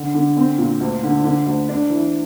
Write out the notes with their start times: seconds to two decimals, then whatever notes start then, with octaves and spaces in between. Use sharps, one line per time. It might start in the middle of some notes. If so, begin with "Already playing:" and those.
Already playing: D3
0.14 D3
0.37 C4
0.58 A#2
0.80 D2
1.03 D3
1.24 D3
1.46 D2
1.69 D4
1.90 E3